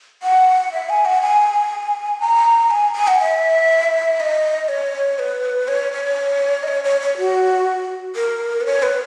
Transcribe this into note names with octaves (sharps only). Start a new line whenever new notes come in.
F#5
E5
G#5
F#5
G#5
A#5
G#5
G#5
F#5
E5
D#5
C#5
B4
C#5
C#5
D#5
C#5
C#5
C#5
F#4
A#4
B4
C#5
B4